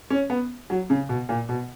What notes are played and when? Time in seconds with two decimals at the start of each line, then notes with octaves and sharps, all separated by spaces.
0.10 C#4
0.30 B3
0.70 F#3
0.90 C#3
1.09 B2
1.29 A#2
1.49 B2